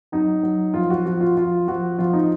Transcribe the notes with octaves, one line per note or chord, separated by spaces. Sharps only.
F#3 D#4
F#3
F3 F4
F#4
F3 F#4
F4
F3 F4
F3 F#4
F3 F4
D#4